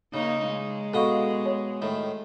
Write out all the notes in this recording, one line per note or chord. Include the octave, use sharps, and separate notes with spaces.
C#3 A#3 D#4
G#3
B2 A4 D#5 F5 C#6
C#5
A2 D#3